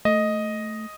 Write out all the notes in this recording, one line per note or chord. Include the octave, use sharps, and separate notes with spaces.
A3 D#5